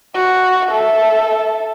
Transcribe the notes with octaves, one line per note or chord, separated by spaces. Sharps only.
F#4
A4 E5